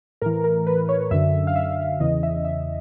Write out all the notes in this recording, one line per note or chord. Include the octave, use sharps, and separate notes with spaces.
A2 E3 A#4
A#4
B4
C#5
F#2 D3 E5
F5
E5
E2 C#3 E3 D#5
E5
E5